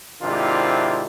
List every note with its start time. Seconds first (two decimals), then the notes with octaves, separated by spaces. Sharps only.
0.22 G#2 C3 D#3 D4 E4 F4